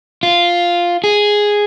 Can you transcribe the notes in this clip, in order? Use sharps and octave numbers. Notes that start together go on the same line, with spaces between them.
F4
G#4